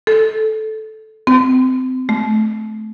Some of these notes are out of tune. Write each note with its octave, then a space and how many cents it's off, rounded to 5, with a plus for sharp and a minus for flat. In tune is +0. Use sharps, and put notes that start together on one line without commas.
A4 -10
C4 -25
A3 -20